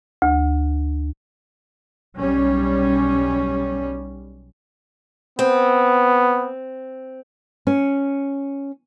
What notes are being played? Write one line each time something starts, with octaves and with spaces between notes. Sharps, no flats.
D2
B1 G3 C#4
B3 C4
C#4